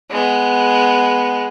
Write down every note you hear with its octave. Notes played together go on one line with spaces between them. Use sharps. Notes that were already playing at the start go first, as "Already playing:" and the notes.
G#3 B3